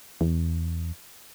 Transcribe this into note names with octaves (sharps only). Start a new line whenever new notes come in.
E2